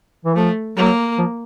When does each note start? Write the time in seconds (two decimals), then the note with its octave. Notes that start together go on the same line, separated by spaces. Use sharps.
0.25 E3
0.36 F3 A3
0.77 F#3 A#3
1.18 F3